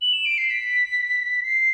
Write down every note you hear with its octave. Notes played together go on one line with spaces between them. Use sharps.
F#7
E7
D7
C7
B6
C7